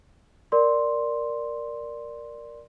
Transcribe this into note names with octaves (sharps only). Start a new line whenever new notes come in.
A#4 D5 C6